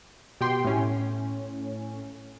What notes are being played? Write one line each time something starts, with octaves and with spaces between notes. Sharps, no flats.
B2 G4 G5 C6
A2 C#4